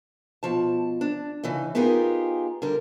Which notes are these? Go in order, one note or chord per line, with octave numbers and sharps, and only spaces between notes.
B2 F3 A5
D4
C#3 E3 D#4
B3 D#4 F4 G4 G#4 A#4
D3 G3 A#4